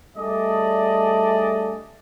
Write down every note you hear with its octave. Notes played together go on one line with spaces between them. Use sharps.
G3 A3 D4 G#4 D5 D#5